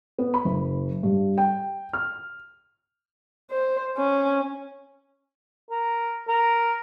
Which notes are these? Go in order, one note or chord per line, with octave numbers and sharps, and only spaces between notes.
B3
B5
F#1
G2
G5
F6
C5
C#4
A#4
A#4